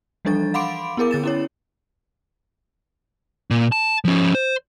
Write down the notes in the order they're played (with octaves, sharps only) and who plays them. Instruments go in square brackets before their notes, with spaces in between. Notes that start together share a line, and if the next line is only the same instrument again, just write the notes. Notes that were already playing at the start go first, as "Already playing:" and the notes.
[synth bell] E3 F3 G3 D4 A4 A6
F5 F#5 B5 C6 D6 D7
B3 E4 G#4 A#4 D6
D3 A6 E7
C#4 E4 C#5
[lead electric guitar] A#2
A5
F3 C#4
C5